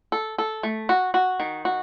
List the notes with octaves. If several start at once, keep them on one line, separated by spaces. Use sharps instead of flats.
A4
A4
A3
F#4
F#4
D#3
F#4